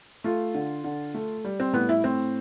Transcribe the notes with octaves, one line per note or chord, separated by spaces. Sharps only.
A3 F4
D3
D3
A3
G3
C4
A2 B3
E4
A2 C4